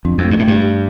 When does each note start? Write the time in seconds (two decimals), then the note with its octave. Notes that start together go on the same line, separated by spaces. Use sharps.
0.05 F2 D4
0.18 F2
0.24 A3
0.31 G2
0.39 A2
0.43 G2 A3
0.62 G4